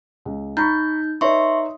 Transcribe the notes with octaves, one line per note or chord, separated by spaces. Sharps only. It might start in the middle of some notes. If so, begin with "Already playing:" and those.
C#2
D#4 A#5 B5 C#6 G6
D#4 B4 C#5 E5 C6 C#6